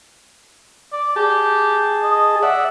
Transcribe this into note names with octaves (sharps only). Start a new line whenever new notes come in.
D5
G4 G#4 A5
D#5
D5 E5 F#5